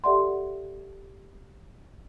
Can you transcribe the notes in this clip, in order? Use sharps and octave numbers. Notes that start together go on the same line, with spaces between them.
G4 A4 D5 E5 F#5 C6